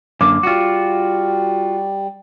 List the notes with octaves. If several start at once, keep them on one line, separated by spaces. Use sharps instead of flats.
F#2 D3 A#3 D6
G3 F4 F#4